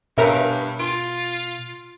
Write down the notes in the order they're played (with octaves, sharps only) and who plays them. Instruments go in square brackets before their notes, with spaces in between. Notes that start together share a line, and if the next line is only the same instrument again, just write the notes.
[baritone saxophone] G2 [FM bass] B2 [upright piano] C#4 B4 F5 [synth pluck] A#4 E5
[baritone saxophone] F4 [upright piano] C6 D7